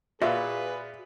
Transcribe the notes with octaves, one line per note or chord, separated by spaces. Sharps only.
A#2 F4 F#4 G#4 B4 E5